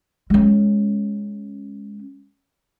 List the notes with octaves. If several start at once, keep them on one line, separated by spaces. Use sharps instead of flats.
G#3 C#4